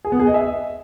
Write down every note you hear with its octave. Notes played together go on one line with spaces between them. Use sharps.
G#4
B3
G#4
D#5
E5